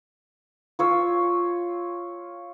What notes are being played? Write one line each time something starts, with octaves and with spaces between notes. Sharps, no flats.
F4 C#5 E6